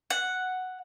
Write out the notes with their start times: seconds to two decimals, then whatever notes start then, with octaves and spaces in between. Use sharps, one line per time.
0.10 F#5